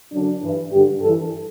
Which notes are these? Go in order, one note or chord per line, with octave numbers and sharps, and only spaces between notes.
F#2 D3 D4
G2 E3
G2 D3 G4
G2 E3 A4